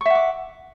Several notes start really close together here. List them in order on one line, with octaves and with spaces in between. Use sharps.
C#6 E5 F#5 D6